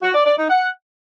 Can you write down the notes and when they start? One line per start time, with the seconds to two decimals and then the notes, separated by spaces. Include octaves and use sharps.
0.03 F#4
0.15 D5
0.26 D5
0.38 D#4
0.50 F#5